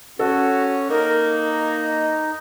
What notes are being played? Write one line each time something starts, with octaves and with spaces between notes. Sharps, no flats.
C#4 F#4 A4
A#3 D#4 A#4
D#5